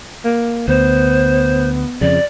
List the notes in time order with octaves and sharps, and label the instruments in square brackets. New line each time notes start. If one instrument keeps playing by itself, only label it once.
[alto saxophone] A#3
[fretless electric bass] D2 [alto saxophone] B3 [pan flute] C5
[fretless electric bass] F2 C#3 [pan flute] D5